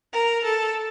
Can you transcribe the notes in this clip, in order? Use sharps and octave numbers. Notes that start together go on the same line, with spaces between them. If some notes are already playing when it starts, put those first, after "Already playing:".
A#4
A4